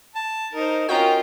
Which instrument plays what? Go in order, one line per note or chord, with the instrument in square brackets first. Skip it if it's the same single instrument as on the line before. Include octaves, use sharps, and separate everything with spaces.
[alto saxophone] A5
[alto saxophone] D#4 [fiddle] A#4 C5
[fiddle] C#4 F4 [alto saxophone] F#4 [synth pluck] A#4 D#5 G5